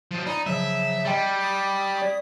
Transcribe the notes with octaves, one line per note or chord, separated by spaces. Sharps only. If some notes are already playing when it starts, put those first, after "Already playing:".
F3 F#3
D#4 D5 A#5 B5
C#3 F3 F#3 E5
G3 D#5 G5 C6
D#6 B6
D5 C#6